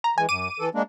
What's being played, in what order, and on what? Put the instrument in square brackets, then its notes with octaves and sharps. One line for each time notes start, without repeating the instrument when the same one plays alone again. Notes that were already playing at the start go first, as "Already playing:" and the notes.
[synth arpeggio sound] A#5
[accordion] E3 G#3 [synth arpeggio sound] G#5
[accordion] F#2 [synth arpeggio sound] D6 D#7
[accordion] E3 A4
G#3 A#3 D4